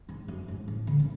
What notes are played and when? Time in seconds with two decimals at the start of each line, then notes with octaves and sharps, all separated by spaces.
0.09 G#2
0.28 F#2
0.48 G#2
0.68 A2
0.87 D3
1.00 C#4